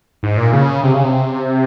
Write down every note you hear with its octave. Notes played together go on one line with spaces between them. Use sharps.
G#2
A#2
C#3
C3
C#3
C3